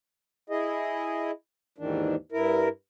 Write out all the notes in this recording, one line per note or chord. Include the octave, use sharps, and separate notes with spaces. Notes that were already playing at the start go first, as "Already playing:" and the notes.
E4 G#4 D#5
D#2 G#2 D#3 E3 D4
G2 E4 A#4